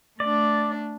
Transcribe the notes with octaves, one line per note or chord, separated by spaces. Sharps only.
A3 D4 D5